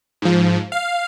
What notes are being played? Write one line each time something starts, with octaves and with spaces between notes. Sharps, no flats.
G#2 F3
F5